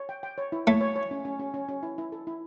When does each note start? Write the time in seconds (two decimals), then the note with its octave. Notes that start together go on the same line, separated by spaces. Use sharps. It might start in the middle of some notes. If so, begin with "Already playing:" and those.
Already playing: C#5
0.09 G5
0.23 G5
0.38 C#5
0.52 E4
0.67 A3 C#5
0.81 C#5
0.96 C#5
1.11 C#4
1.25 C#4
1.39 C#4
1.54 C#4
1.69 C#4
1.83 E4
1.98 E4
2.12 A4
2.27 E4